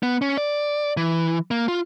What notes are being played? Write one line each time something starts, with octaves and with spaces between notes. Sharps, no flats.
B3
C#4
D5
E3
A#3
F4